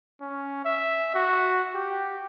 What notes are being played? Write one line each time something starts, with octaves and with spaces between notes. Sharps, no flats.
C#4
E5
F#4
G4